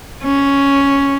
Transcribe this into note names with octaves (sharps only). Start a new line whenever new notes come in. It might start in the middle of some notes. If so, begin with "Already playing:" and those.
C#4